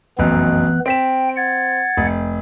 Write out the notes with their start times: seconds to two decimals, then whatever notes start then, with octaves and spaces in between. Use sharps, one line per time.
0.19 F1 B1 F#2 E3 B3 F#6
0.86 C4 G5 B6 E7
1.36 F#5 G#6 A6
1.97 F1